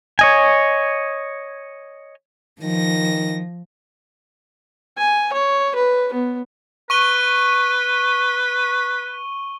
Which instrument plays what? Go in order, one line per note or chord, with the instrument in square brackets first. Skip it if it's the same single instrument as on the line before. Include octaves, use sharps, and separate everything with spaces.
[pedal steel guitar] C#5 D#5 G#5
[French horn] D#3 [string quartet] F3 A#6
[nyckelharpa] G#5
C#5
B4
B3
[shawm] B4 [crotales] C#6 D#7 G7